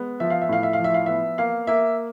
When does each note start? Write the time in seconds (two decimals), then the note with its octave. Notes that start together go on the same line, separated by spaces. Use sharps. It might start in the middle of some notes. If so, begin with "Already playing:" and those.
Already playing: G#3 B3
0.20 F3 E5
0.30 F5
0.41 E5
0.49 A2 F5
0.63 E5
0.73 F5
0.79 F3 E5
0.94 F5
1.06 B3 E5
1.38 A#3 F5
1.67 A#3 E5